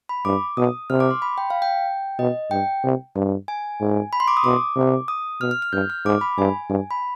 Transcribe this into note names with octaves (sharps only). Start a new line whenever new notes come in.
B5
G2 D6
B2 D#6
C3 F6
D6
C6
B5
G5
F5
G5
B2 D#5
G2 G5
C3
G2
G#5
G#2
B5
C6
D6
D#6
B2 D6
C3
D#6
B2 F6
F6
F6
G2 G6
F6
G#2 D6
B5
G2 G#5
G2
B5